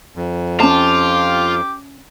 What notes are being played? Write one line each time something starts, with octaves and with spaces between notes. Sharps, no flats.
F2
C#4 F4 G4 A5 D6